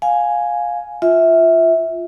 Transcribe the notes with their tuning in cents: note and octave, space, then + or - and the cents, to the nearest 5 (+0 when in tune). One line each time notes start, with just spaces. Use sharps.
F5 +15 G#5 +0
F4 +0 E5 -15